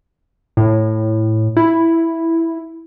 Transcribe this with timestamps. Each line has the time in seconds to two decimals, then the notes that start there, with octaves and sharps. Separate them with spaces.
0.57 A2
1.57 E4